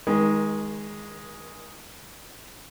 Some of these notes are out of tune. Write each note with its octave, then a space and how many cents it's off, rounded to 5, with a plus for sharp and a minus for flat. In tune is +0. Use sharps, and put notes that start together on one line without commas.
D#3 +20 G#3 +0 A#4 +45